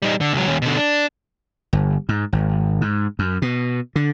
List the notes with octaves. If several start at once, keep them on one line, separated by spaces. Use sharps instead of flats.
G3 D#4
D3
C#2 F#3
D#2 C#4
B2 D3
D4
G1
G#2
G#1
G#2
F#2
B2
D3